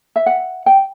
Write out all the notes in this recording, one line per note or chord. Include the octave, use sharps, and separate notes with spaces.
E5
F#5
G5